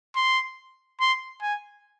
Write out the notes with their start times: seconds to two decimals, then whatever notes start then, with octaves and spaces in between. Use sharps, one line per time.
0.16 C6
1.00 C6
1.42 G#5